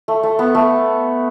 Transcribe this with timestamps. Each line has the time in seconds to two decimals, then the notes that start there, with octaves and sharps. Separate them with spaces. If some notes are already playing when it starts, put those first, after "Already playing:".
0.08 A3
0.23 A3
0.39 B3
0.55 A3